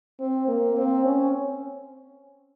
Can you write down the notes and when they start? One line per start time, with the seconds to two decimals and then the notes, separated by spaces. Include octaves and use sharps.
0.20 C4
0.48 A#3
0.77 C4
1.05 C#4